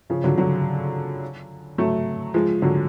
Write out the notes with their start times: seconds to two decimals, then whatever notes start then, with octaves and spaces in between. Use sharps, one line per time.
0.10 C#3 F3
0.24 D3 F#3
0.38 D3 F#3
1.78 F#3 A3
2.34 F3 G#3
2.62 D3 F#3